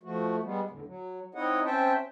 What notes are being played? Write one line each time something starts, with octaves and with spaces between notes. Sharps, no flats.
F3 A3 F#4
G3 G#3 B3
E2 A2 D3
F#3
C4 D#4 E4 C#5 D#5 F#5
C4 C#4 C5 E5 G5 A5